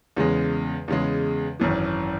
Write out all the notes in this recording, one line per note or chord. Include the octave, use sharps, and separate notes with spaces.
E2 C#3 G#3
E2 C#3 G#3
G#1 F#2 E3